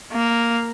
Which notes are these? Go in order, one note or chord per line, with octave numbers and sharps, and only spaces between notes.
A#3